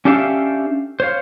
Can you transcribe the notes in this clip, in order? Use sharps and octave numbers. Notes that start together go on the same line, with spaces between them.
C#4 D4 G4 A4 E5 F5
C5 C#5 F5